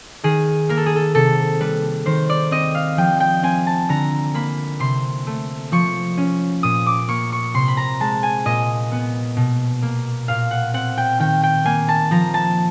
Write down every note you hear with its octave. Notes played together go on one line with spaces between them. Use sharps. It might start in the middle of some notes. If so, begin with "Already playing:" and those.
D#3 G#4
A#3 A#4
A4
G#4
A4
C3 A4
G3 B4
D#3 C5
D5
C4 D#5
F5
F3 G5
G5
C4 G#5
A5
D3 A#5
A#3 B5
C3 C6
A3
F3 C#6
C#4
A#2 D#6
D6
A#3 C#6
C#6
C3 C6
B5
A#5
G#3 A5
G#5
A#2 D#5
B3
B2
A#3
A#2 F5
F#5
C4 F#5
G5
D#3 G5
G5
A#3 G#5
A5
F3 A#5
A5